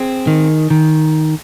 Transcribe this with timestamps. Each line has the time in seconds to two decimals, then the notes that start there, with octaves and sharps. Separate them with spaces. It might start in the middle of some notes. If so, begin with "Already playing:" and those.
Already playing: C4 G#4
0.27 D#3
0.70 D#3